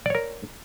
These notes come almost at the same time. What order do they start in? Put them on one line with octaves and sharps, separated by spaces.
D5 C#5 A#4